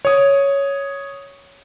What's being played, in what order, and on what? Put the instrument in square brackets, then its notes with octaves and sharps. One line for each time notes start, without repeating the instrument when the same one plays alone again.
[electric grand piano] C#5 D#6